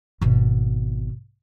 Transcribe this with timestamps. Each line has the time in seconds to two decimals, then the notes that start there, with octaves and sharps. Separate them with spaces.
0.21 G#1 B2